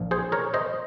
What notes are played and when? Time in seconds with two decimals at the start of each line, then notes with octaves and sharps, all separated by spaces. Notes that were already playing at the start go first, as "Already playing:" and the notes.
Already playing: A#1 A#2 F3
0.11 G#4 C5
0.32 A#4 C#5
0.54 C5 D#5